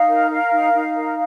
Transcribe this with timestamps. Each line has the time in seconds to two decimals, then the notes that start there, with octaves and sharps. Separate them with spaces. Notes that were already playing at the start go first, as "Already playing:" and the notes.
Already playing: D#4 F5
0.09 A#4
0.31 A#4
0.52 D#4
0.74 D#4
0.96 A#4